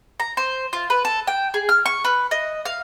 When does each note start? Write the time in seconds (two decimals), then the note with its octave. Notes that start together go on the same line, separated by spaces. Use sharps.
0.20 A#5
0.37 C5
0.73 F4
0.90 B4
1.05 A4
1.27 G5
1.54 G#4
1.69 F6
1.86 C#6
2.04 B4
2.31 D#5
2.65 F5